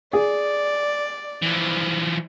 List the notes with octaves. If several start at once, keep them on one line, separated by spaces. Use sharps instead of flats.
G#4 D5
E3 F3